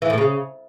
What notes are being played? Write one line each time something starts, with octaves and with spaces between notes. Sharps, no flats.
E3
A2
C#3